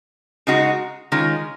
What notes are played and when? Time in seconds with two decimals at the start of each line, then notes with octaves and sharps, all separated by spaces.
0.47 C#3 G#3 D#4 F#4
1.12 D#3 G#3 C#4 F4